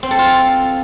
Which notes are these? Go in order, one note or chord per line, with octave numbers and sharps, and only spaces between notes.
C4
A4
F4